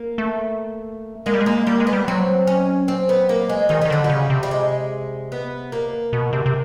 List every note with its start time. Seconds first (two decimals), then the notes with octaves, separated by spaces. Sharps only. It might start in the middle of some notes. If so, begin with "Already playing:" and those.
Already playing: A#3
0.18 A3
1.26 G#3 A#3
1.34 G3
1.41 G#3
1.46 A#3
1.67 G3 A#3
1.80 G#3
1.87 B3
1.93 G3
2.08 F#3 C4
2.47 C#4
2.88 C4
3.09 B3
3.29 A#3
3.49 G#3
3.69 D#3 G#3
3.81 D#3 G3
3.90 D3 F#3
4.04 G3
4.10 C#3
4.30 C3
4.43 G3
4.51 G#3
5.32 B3
5.72 A#3
6.13 B2
6.33 C3
6.46 C3